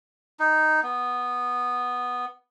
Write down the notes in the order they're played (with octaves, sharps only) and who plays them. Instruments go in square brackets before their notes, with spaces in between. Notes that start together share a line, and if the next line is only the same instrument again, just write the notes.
[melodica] D#4
B3